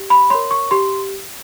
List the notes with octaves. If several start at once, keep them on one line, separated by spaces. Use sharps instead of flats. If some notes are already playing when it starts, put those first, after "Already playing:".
Already playing: G4
B5
A#4 C#5 C6
C#6
G4 C6